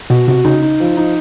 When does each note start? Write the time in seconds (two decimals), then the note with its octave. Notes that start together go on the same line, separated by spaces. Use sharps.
0.10 B2 F#4
0.28 C3 F#4
0.44 C#3 D#4
0.62 D#4
0.80 F3
0.97 D#4